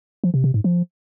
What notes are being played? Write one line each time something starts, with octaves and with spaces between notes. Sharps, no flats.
F3
C3
C3
G#2
F3